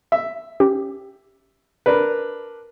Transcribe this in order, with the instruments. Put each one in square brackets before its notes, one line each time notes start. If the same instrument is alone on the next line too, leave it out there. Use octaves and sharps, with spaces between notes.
[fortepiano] E5
[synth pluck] C#4 G4
[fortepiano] D4 A#4 B4